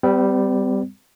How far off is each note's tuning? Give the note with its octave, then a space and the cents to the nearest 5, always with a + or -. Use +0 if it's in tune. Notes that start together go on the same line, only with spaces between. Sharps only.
G3 +0 C4 -45